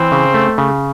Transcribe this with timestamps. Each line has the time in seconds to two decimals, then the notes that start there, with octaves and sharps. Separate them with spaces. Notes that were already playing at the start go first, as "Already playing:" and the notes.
Already playing: E3 C4
0.12 C#3
0.34 A3
0.58 C#3